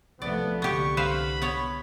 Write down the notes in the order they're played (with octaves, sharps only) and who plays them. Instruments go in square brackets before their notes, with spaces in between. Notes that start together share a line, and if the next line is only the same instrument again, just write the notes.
[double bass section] C2 F3 A3 [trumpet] B3 [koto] D5
[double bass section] C2 D3 [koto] B3 G4 [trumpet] C#6
[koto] B4 C5 F5 [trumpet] B5
[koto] B3 C#5